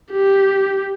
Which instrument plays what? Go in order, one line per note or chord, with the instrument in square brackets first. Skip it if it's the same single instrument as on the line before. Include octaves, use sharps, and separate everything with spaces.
[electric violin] G4